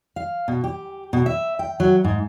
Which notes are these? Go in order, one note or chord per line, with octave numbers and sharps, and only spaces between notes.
F5
B2
G4
B2
E5
G5
F#3
G#2